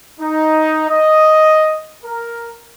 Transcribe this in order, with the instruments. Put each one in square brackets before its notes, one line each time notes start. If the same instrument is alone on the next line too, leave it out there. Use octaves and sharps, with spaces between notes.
[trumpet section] D#4
D#5
A#4